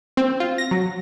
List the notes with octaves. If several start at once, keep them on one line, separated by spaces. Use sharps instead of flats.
C4
F4
A#6
F#3